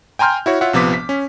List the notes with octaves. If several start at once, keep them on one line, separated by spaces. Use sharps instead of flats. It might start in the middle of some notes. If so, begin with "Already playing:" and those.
G5 G#5 A#5 C6 F6 G6
E4 F#4 C#5
F4 C#5 E5 F#5
A#1 C3 F3 B3 D6 B6
B6
C#4